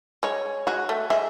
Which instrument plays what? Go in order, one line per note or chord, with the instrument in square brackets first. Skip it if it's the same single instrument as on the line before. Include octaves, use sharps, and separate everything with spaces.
[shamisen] G#3 [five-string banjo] C#5
[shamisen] G#3 [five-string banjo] F#4
[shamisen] A3
[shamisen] G#3 [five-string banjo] E5